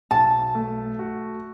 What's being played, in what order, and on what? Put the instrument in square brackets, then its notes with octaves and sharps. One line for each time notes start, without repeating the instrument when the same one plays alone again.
[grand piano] B1 [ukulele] A5
[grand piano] A3
F#4